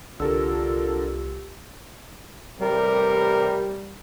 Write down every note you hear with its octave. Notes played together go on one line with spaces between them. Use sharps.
C2 D3 F4 G4 A4 A#4 E6
A1 C3 G3 A#4